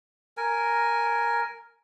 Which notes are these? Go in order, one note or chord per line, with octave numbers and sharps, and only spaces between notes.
A#4 G#5